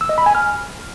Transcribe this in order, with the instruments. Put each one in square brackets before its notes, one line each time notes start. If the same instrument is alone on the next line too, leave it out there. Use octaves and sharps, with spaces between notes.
[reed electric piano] E6
D#5
B5
G#5
F6